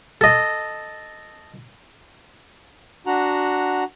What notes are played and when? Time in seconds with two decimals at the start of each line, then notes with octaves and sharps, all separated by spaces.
0.21 A4 D#5
3.07 D4 F#4 F#5 A#5